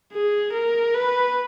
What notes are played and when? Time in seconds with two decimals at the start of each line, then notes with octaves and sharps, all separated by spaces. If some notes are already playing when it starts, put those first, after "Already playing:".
0.13 G#4
0.53 A#4
0.94 B4